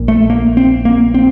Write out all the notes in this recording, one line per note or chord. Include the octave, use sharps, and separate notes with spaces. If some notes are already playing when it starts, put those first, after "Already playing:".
Already playing: A#1 A#2
A3
A#3
C4
A#3
C4